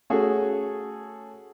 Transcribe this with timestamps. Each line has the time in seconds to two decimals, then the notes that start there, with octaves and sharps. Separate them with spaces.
0.10 A3 C#4 F#4 G#4 A4